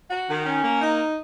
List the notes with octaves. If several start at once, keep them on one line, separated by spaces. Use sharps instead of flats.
F#4
D#3
C#4
A#3
D#4